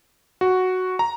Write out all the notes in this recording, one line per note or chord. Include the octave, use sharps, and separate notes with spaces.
F#4
A#5